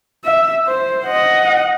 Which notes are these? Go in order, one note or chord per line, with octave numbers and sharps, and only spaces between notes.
E5
C5
D#5 F#5